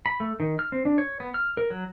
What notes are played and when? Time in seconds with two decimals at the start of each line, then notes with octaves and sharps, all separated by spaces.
0.06 B5
0.20 A3
0.40 D#3
0.59 F6
0.72 C4
0.85 D4
0.98 C#5
1.20 B3
1.34 F6
1.57 A#4
1.70 F#3